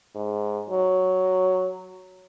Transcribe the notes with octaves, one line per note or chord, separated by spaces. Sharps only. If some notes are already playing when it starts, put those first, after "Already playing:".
G#2
F#3